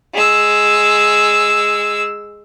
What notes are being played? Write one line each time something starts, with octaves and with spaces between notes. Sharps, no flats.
G#3 E6